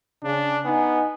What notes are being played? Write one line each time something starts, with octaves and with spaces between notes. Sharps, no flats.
C#3 D4
B3 D#4 G#5